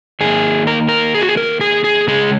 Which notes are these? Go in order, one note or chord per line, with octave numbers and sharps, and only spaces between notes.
D#3 A#3 G#4
A#4
A#4
G#4
F#4
G#4
A#4
G#4
G#4
C#3 G#3 G#4